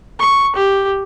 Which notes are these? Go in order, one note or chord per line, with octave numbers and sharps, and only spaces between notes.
C#6
G4